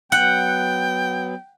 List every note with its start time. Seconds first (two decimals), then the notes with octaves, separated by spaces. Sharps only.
0.12 F#3 B3 F#5 G5